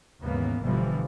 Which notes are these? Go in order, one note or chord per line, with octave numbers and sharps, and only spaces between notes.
D#2 G#2 C#3 E3 A#3 B3
G1 B2 D3 E3 F3 G3